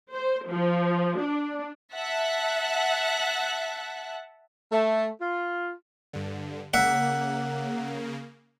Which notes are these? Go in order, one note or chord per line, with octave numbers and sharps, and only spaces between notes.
C5
F3
D4
E5 F#5 A5 F#6
A3
F4
G2 D3
C#3 A#3 E5 F#5